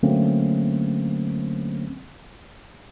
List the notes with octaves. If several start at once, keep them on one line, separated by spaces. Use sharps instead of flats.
D3 F#3 A3 A#3 C4 C#4